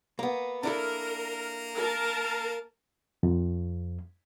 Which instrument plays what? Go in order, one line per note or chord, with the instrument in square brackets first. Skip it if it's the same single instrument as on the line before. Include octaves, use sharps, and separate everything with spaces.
[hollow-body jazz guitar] A#3 B3
[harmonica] A#3 A#5 [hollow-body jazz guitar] D4 E4 A4 [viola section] A#4
[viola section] A#4 A5
[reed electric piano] F2